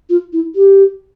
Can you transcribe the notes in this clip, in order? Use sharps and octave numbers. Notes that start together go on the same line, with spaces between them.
F4
E4
G4